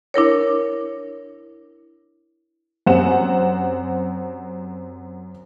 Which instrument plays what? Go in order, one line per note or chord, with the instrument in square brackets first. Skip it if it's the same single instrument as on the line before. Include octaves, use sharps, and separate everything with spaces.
[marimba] D4 E4 A#4 C#5
[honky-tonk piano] F#2 C4 G4 F#5 E7